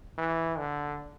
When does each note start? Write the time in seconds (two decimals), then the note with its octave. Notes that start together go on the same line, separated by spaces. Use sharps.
0.18 E3
0.58 D3